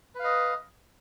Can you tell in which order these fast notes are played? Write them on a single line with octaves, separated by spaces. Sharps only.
B4 F5 D#5